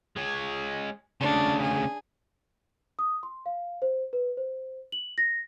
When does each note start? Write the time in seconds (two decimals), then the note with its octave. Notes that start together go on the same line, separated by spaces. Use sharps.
0.16 G#3 C#5
1.21 D2 C#3 D4
1.62 G#4
2.99 D#6
3.23 C6
3.46 F5
3.82 C5
4.13 B4
4.37 C5
4.92 F#7
5.18 A#6